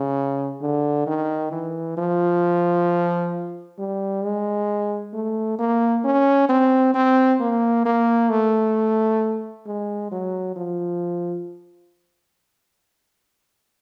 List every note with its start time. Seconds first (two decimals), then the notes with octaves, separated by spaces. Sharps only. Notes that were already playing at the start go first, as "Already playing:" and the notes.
Already playing: C#3
0.62 D3
1.07 D#3
1.52 E3
1.97 F3
3.79 G3
4.23 G#3
5.13 A3
5.59 A#3
6.04 C#4
6.49 C4
6.94 C4
7.40 A#3
7.86 A#3
8.30 A3
9.66 G#3
10.11 F#3
10.56 F3